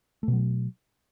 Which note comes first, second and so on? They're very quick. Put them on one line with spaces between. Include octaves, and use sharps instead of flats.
A3 B2 F#3